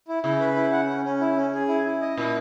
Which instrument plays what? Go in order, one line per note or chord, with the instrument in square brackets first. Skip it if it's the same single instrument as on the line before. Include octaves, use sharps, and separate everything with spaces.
[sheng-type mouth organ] E4
[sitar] C#3 [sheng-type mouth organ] E4
[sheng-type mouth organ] B4
E4
F#5
C#4
C#4
E4
C#4
G#4
E4
E4
D#5
[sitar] A#2 [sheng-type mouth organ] E4